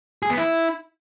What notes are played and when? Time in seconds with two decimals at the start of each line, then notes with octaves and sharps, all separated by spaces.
0.23 G#4
0.30 B3
0.37 E4